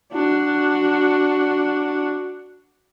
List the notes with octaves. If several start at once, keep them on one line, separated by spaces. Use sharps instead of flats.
D4 F#4